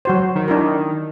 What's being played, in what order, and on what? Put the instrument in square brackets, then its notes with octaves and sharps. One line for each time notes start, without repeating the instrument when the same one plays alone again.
[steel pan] F#3 F#4 C5
[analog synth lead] D#3
[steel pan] D4 E4 A#4